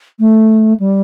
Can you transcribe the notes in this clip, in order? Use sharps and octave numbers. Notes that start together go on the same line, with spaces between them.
A3
G3